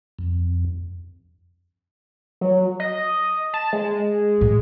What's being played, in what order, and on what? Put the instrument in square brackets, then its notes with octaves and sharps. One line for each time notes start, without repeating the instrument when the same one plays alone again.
[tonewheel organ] F2
[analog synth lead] F#3
D#5
A5
G#3
[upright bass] A2